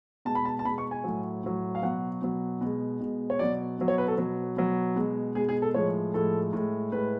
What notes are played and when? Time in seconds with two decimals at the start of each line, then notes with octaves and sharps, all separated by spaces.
0.25 B2 G#3 A5
0.35 B5
0.45 A5
0.59 A5
0.65 B2 B5
0.69 G#3
0.78 C#6
0.91 G#5
1.04 A2 F#3
1.44 A2 F#3
1.75 F5
1.83 B2 F#3 F#5
2.22 B2 F#3
2.61 B2 G#3
3.00 B2 G#3
3.30 C#5
3.39 B2 F#3 D5
3.79 B2 F#3
3.88 C#5
3.98 B4
4.08 A4
4.18 B2 F#3
4.57 B2 F#3
4.96 B2 G#3
5.35 B2 G#3 G#4
5.49 G#4
5.62 A4
5.74 A2 F3 G#3 C#5
6.14 A2 F3 G#3 A4
6.53 A2 G#3
6.92 A2 G#3 B4